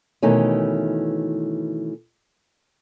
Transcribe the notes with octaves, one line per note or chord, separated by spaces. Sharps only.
B2 D#3 E3 A3 C#4